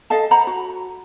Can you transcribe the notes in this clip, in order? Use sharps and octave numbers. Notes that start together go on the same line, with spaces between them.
A4 D#5 F5 A5
C5 F#5 A#5 B5
F#4